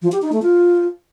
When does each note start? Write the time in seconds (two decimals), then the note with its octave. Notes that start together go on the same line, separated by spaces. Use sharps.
0.02 F3
0.12 G4
0.22 D#4
0.32 A3
0.42 F4